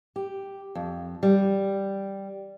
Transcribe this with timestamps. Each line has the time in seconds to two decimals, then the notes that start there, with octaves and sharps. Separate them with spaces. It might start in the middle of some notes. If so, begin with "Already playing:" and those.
0.16 G4
0.75 F2
1.23 G3